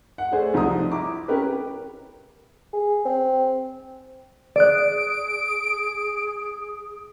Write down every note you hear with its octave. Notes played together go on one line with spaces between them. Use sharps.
F#5
A3 D4 G#4 C5
C2 F3 D#4 A#5 D#6
E4 A#5 D6
C#4 G4 A#4 B4
G#4
C4
G#4 D5 F#6 D7
G#4